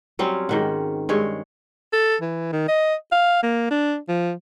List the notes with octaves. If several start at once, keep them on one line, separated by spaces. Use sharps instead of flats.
F#3 G3 C4 C#4
G#2 D#3 F#4
G2 G#3 C#5
A4
E3
D#3
D#5
F5
A#3
D4
F3